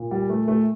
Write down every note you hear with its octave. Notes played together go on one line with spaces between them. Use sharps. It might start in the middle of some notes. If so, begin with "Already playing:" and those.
Already playing: A#2
G3
A3
A3